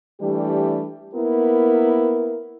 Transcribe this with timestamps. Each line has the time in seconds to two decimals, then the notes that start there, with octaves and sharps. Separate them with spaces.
0.21 E3 G3 A3 D4 G4
1.14 A#3 B3 E4 A#4